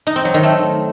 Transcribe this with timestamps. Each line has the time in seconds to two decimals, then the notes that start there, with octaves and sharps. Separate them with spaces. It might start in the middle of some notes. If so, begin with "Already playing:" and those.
0.07 D#4
0.16 C4
0.25 F#3
0.34 D#3
0.43 A3